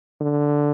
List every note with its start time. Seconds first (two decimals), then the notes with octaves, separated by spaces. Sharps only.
0.21 D3